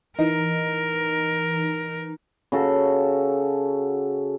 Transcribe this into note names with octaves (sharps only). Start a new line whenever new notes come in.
E3 D#4 A#4
C#3 F#4 A4